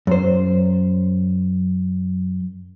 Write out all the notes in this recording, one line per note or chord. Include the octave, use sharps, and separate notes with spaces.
F#2 C5